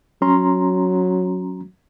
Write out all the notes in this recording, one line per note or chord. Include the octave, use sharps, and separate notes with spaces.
F#3 C#4 A#5 C6